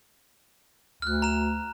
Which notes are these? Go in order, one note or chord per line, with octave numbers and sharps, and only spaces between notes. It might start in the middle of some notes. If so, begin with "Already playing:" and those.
D2 F6 F#6
A#5 E7